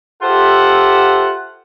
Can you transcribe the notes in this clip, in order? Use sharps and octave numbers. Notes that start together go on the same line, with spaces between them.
F4 G4 A4 C5 E5 F#5